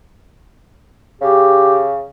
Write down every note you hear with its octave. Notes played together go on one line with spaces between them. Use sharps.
C#3 G4